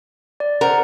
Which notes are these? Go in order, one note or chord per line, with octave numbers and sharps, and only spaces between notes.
D5
A#4 C5 F#5 A#5